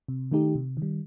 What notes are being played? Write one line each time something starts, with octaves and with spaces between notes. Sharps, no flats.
C3
D#3 A3 D#4 G4
C3
D#3 G3